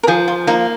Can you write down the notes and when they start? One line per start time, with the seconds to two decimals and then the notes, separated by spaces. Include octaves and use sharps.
0.03 A#4
0.07 F3 G#4
0.28 F4
0.47 A#3 D#4